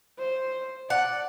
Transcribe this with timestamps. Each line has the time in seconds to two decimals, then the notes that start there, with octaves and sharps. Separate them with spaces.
0.19 C5
0.90 D5 F#5